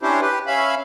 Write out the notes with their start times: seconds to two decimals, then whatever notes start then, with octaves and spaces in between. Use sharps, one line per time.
0.02 C#4 D4 E4 G4 C5
0.21 G4 B4
0.47 C#4 E5 F5 B5